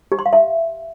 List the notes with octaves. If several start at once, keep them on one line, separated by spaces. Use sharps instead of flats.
G4
C6
F5
E5